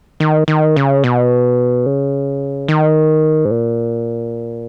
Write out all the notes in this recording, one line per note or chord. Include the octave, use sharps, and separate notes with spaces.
D#3
D#3
C#3
B2
C#3
D#3
G#2
A#2